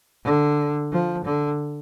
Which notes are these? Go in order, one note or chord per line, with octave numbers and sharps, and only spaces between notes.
D3
F3
D3